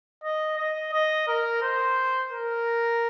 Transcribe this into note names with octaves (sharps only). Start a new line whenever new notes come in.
D#5
D#5
D#5
A#4
C5
A#4